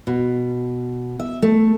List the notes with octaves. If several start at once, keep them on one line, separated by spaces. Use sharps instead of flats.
B2
E5
A3